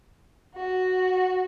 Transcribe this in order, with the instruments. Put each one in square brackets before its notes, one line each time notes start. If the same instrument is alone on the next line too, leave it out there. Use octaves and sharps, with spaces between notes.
[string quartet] F#4